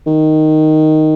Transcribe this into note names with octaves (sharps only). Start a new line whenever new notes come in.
D#3